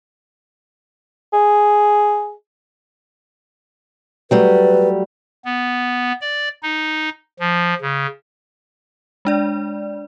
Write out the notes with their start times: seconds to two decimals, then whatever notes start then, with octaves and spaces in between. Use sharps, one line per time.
1.33 G#4
4.31 F#3 G3 A3 B4
5.45 B3
6.21 D5
6.63 D#4
7.40 F3
7.81 C#3
9.25 G#3 D4 D5